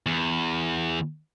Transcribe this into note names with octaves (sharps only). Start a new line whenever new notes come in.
E2